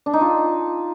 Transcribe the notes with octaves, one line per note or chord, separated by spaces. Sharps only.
D4
D#4
F4